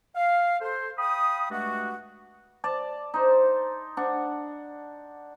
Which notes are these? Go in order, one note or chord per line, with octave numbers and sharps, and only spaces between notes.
F5
A4 C5
F5 G5 B5 D#6
G2 G#3 A3 D4 F#4
D5 A5
D#4 C5
D4 F#5